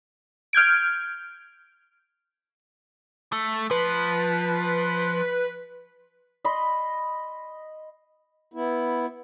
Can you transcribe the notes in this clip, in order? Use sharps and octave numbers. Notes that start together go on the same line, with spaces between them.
F6 G6 G#6 D7
A3
F3 B4
D#5 B5 C6
B3 E4